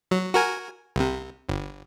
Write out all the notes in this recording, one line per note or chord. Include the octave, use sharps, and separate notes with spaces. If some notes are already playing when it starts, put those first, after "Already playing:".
F#3
F#4 A#4 G#5
C2 C3
G1